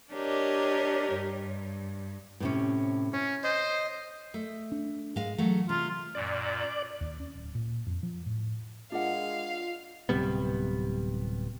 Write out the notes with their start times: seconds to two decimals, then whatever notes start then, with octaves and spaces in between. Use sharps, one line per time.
0.12 D4 G4 A#4 C#5 D#5
1.14 G2
2.40 A2 C3 C#4
3.13 C#4 C#5
3.44 C5 D#5
4.34 A3
4.72 D4
5.16 G#2 G#3 F5
5.38 E3 F#3 A3
5.69 C3 F4
6.15 F#2 A#2 D5
7.01 D#2
7.20 C#4
7.35 D1
7.55 A#2
7.86 F2
8.03 F3
8.26 A2
8.92 G#3 D4 F4 A#4 F5 F#5
10.09 D1 C3 G3 B3